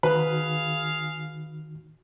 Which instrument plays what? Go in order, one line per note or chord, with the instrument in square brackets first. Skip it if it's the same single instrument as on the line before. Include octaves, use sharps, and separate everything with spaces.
[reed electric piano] D#3 D#4 F#4 [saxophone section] G#4 F5 [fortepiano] B4